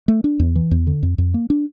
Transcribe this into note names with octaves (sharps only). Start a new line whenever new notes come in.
A3
D4
E2
E3
E2
D3
F2
F2
A#3
D4